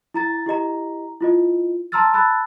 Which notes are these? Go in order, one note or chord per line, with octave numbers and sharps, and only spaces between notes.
E4 A#5 A6
E4 G4 D#5 A#5
E4 F4 D#5
A5 A#5 C6 E6 F6 A6
A5 B5 E6 F#6 A6